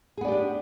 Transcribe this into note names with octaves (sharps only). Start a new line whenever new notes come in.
B3 D4 G4 G#4 D5